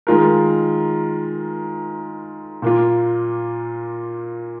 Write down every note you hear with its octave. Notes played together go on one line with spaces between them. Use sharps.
D#3 G#3 F4 A#4
A#2 A#3 F4